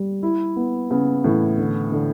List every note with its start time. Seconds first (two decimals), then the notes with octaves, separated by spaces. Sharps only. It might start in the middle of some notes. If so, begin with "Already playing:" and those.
Already playing: G3
0.23 E4
0.56 B3
0.90 C#3 B3
1.24 A2 E3
1.58 D3
1.92 D3